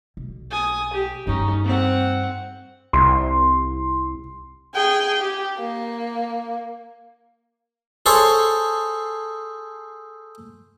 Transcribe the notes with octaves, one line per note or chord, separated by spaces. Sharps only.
B1
G#5 D#6
G4
G2 G3 C#4 D#4
C4 F#5
C2 C6
G#4 G5
G4
A#3
G#4 A4 C5 C#5